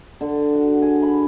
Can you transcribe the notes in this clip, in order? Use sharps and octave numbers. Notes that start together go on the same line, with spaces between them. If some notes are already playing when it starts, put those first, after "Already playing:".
D3
F#4
G#4
B5